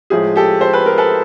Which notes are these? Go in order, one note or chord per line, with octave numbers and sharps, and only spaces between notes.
A2 F3 G#3 G#4
G4 A4
C5
B4
A#4
A4 B4